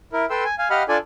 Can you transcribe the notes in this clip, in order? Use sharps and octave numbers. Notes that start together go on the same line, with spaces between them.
E4 A#4
A4 B4 G5 C6 E6
G#5
F5 G#5
G4 D#5 F5 F#5 B5 F6
D4 F4 A4 D5 G#5